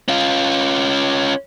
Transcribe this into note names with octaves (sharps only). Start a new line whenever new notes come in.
C#4 F4